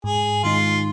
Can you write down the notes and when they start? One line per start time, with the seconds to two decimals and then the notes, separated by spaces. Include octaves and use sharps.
0.04 G#2 G#4
0.44 D#3 G#3 D#4 F4